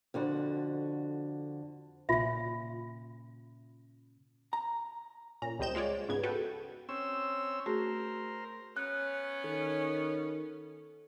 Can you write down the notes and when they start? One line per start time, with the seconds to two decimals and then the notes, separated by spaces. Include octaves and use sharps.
0.14 F2 D3 F#4
2.09 A#2 C#3 F4 E5
4.53 A#5
5.42 A#2 C#4 A#5
5.59 C#2 G3 C4 D#5 G6 E7
5.75 G#3 F4 C#5 D5
6.09 G#2 C#3 B3 G#6
6.23 F#4 A4 B4 G5
6.89 C4 C#4 E6
7.66 A3 F#4 G#4 A#4 C5
8.77 B3 C#4 F#6
9.44 D#3 A4